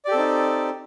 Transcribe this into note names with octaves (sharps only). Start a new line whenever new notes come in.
C4 D#4 G4 A4 D5